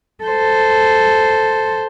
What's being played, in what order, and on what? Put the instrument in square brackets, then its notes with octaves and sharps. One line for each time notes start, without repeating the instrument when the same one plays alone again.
[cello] A4 C5